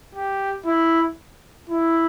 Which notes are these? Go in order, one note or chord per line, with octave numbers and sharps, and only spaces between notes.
G4
E4
E4